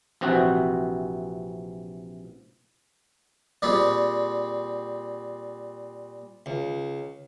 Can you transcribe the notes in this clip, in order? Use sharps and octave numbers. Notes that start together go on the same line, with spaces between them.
A#1 C3 E3 C4 F#4
A#2 G3 C4 G4 G#4
C#2